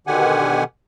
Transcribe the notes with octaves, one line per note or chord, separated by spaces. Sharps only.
B2 D3 D#3 G4 F#5 G#5